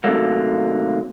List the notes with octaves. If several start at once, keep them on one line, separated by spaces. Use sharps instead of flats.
D#2 C3 F#3 A3 A#3